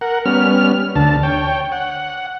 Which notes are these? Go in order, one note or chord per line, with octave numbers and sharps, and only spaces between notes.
A#4 F#5
G3 B3 C#4 F6
D2 D3 A5
C#5 G5
F#5